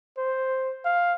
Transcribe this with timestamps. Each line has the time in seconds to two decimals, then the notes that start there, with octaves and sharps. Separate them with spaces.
0.17 C5
0.84 F5